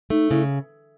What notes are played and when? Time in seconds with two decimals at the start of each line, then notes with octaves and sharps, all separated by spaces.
0.10 A3 D#4
0.30 C#3 E4